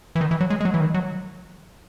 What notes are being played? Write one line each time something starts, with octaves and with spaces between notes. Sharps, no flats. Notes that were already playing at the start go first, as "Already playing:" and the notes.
E3
D#3
E3
F#3
G#3
G#3
F#3
E3
D#3
F#3